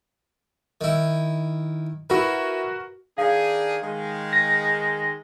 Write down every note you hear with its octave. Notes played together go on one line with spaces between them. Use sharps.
D#3 E4
E4 F#4 A#4 B4
D#3 D4 G#4 F5
D#3 G#3
A#6